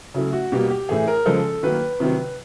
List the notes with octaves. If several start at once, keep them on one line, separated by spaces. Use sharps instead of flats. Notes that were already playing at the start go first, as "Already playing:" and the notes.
C#3 F#3 A3 E4
F#4
B2 G3 A#3 G4
G4
A2 E3 A3 G#4
A#4
C#3 F3 G#3 A4
D#3 F#3 A#3 B4
C3 D#3 F#3